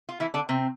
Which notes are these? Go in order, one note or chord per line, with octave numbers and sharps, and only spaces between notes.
F4
E3 E4
D3 D4
C3 C4